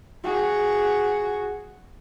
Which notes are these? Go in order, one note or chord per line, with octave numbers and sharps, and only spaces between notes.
F#4 G#4